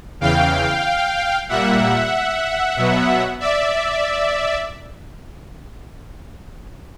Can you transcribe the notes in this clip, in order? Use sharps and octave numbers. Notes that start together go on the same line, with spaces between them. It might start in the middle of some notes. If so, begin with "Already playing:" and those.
E2 C#3 E3 F5 G5
A#2 G3 A#3 E5 F#5
B2 F#3 B3
D5 E5